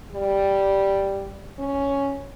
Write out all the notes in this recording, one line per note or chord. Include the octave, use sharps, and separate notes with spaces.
G3
C#4